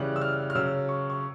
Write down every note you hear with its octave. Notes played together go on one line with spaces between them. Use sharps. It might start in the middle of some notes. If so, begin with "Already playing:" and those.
Already playing: C#3 E3 G3 F#6
E6
F6
F6
C#3 F#3 E6
C#6
C#6